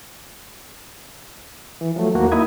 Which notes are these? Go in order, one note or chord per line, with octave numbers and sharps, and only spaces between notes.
E3
F3 F#3 A3
D#2 A#3 F#4
D#4 E4 B5 D#6 G#6